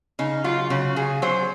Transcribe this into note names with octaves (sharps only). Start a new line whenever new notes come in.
C#3 D#4
F#3 F4
C#3 F#4
C#3 G#4
F#3 C5